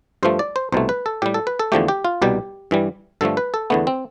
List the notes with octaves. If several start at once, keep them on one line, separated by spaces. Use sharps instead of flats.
G2 F3 A3 C5
D5
C5
C2 B2 A3 C5
B4
A4
A2 G3 G4
A4
B4
A4
E2 D3 F3 A3 G4
G4
F4
C2 B2 G3 G4
G2 E3 G3
G2 D3 F3 A3 A4
B4
A4
E2 D3 A3 B3
C4